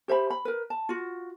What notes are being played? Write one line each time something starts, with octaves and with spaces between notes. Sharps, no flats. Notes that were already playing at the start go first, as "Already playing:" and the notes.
G4 C5 E5 B5
B5
A#4 B4
A5
F4 F#4